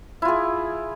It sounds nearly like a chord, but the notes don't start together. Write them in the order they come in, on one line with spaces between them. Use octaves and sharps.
E4 F4 G#4